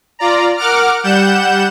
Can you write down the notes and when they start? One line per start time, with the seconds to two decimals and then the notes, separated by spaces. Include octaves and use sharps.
0.19 F4 D5 A#5
0.57 A#4 F#5 D6 F6
1.03 G3 F#5 G6 E7